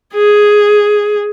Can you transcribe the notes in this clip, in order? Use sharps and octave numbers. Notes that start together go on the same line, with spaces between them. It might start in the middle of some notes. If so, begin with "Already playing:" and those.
G#4